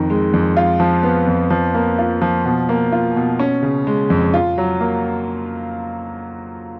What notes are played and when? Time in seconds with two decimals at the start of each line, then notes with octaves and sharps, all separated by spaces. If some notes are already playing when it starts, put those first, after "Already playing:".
Already playing: F2 D#3
0.10 G#3
0.33 F2
0.57 F4
0.80 F3
1.03 B3
1.27 F2
1.50 F3
1.75 A#3
1.99 F4
2.22 F3
2.45 B2
2.69 A#3
2.92 F4
3.16 B2
3.39 C#4
3.63 C#3
3.87 G#3
4.10 F2
4.34 F4
4.58 F#3
4.81 A#3